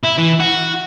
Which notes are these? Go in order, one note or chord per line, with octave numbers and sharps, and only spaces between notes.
E4
E3
F#4